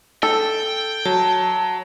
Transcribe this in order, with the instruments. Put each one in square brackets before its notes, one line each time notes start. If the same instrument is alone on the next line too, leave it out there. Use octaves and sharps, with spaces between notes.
[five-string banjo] A4 [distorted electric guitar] G5
[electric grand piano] F#3 [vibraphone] A5